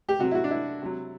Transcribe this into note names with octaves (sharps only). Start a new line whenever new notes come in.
G4
C3 F#3 F#4
E4
F#4
D4
E4
C3 F#3